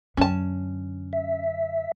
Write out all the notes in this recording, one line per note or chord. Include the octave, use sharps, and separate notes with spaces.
F#2 D3 C#4 A5
E5